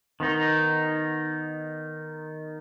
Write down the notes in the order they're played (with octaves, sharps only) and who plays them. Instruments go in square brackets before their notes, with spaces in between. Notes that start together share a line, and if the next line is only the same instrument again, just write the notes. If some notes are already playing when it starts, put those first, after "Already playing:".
[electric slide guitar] D#3 B3 D#4